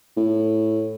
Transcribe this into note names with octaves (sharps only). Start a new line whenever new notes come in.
A2